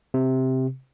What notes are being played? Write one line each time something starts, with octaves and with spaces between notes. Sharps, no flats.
C3